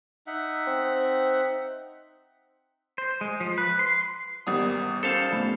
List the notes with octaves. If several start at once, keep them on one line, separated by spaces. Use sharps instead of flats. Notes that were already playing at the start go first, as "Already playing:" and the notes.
D#4 E5 F#5
C4
C5
G#3
F3
B4
C6
G#1 E2 G3 A#3 F#5 D#6
C#4 A4 C5 F5
F1 B3 B5